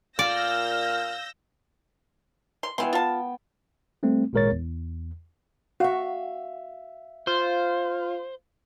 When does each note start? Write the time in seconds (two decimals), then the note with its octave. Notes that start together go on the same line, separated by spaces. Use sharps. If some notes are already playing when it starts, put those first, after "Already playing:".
0.19 A#2 D5 F5 E6 F6 G6 A#6
2.63 C6
2.78 E3 B3 G5 C6
2.93 F4 A5
4.03 G3 A3 C4
4.33 G#1 A#2 G#3 A#4 C#5 A6
4.51 E2
5.80 F#4 E5 F5
7.27 F4 C5